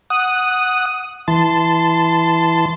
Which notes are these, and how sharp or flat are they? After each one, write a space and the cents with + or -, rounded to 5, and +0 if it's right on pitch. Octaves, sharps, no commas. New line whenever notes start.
F#5 +0 D#6 +0
E3 +0 A5 +0 C6 -20